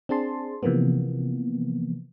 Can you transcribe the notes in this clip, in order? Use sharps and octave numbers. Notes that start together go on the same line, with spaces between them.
C4 D4 G#4 A5 C6
C3 E3 F3 A#3 B3